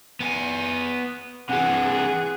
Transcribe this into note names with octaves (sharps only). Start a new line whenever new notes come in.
B3 G#5
C3 E3 G#4 F#5